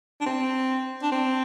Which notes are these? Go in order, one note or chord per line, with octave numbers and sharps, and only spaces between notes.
D4
C4
D4
C4